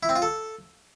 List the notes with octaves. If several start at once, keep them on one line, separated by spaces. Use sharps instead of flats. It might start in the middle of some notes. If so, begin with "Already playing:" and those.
E4
C4
F4
A4